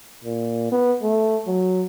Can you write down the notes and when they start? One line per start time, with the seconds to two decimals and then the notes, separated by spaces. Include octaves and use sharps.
0.24 A#2
0.72 B3
1.03 A3
1.47 F#3